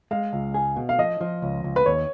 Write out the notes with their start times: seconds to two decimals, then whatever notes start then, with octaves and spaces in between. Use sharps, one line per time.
0.11 G#3 F5
0.33 C#2
0.54 G#4
0.76 B2
0.89 F5
0.98 F3 D#5
1.21 F3
1.42 C#2
1.64 C#2
1.76 B4
1.86 D#2 C#5